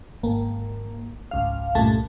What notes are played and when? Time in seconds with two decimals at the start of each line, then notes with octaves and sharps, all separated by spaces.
0.23 G#1 A#3
1.31 G#1 C#2 F5
1.75 C#2 G2 A#2 A3 A5